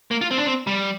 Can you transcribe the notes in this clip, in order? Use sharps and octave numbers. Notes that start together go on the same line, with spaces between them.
A#3
F4
C4
D4
C4
G3